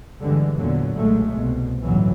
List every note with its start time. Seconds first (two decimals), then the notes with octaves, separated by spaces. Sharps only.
0.21 G2 D3 E3 G3 G#3
0.56 E2 A#2 D3 F#3
0.96 B1 A#2 F#3 G#3 A3
1.36 C2 B2
1.82 G1 C#2 A2 E3 F#3